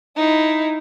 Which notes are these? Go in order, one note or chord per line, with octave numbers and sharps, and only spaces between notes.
D#4 E4